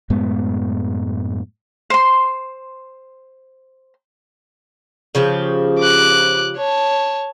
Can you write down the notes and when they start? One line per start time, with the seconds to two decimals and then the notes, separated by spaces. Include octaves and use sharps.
0.10 F#2 A2 G#3 B3
1.90 C5 C6
5.15 C#3 F3 G4
5.79 D6 F#6
6.57 C#5 A5